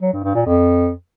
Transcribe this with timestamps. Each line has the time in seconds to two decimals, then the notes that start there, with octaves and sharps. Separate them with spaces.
0.02 F#3
0.13 G2
0.24 G2
0.35 A#2
0.46 F2